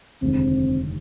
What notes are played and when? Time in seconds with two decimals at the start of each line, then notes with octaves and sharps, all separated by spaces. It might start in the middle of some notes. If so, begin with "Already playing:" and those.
0.22 F1 D#2 D3 G#3 C4